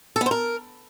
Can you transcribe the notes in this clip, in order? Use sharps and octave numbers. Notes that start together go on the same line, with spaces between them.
A4
B3
C5
A#4